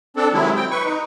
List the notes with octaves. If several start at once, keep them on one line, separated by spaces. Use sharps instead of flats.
C4 D4 A4
C3 D#3 F#3 G#3 E4
C4 G5
B4 C#6
D#4